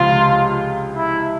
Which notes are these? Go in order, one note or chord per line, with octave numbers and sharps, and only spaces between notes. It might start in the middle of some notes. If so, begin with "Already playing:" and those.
Already playing: C#2 C3 F3 F4
E4